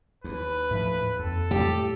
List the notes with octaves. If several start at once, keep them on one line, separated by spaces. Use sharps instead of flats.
D#2 B4
A2 F3
F2 A4
A2 G3 G4